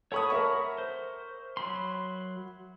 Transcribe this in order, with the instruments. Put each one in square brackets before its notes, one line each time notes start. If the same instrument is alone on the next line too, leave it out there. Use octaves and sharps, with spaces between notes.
[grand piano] A4 C#6 D#6 [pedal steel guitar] C#5 F#5 B5
[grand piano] A#4 E5 C#6
[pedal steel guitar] C5
F#3 B5 C6